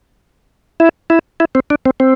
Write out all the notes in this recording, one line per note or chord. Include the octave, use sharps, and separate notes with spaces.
E4
E4
E4
C4
D4
C4
C4